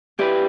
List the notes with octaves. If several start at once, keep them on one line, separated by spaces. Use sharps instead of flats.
G3 E4 G4 B4